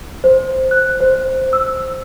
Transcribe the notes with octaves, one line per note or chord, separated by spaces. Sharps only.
C5
F#6
C5
E6